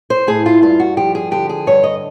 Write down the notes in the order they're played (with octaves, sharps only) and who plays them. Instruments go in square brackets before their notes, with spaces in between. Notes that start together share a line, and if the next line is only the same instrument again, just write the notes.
[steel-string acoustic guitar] C5
A2 G#4
F4
G2 F4
F#4
F3 G4
G#4
D3 G4
G#4
G2 C#5
D#5